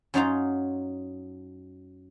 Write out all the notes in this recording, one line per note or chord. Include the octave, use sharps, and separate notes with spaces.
F#2 F#3 D#4 F4 F5 A#5